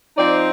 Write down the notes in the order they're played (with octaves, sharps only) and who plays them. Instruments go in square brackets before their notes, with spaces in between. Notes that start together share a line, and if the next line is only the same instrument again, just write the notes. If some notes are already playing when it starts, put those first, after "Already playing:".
[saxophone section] F3 C4 D#4 D5